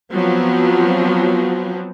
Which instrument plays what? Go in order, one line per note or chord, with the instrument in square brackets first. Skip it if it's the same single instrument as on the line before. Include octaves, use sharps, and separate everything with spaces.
[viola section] F3 F#3 B3 C4